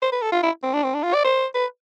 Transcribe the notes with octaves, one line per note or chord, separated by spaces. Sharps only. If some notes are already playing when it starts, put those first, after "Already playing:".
C5
B4
A4
F4
E4
C4
D4
C4
D4
F4
D5
C5
B4